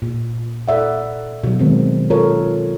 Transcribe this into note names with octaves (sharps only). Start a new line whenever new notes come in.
A#2
A4 D5 E5 F#5
B2 F#3
D#3 G#3 C4
F4 A4 A#4 C#5